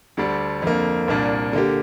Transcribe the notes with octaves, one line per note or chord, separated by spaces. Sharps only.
D2 D3 G3 D4
F2 D3 A#3
C2 A#2 A#3 D4
D3 A#3 G4